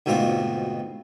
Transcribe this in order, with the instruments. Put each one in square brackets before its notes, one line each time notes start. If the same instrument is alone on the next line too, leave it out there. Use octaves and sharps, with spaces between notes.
[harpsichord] D2 G#2 B2 C4 F4 D6